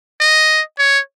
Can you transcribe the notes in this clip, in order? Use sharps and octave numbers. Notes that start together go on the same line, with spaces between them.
D#5
C#5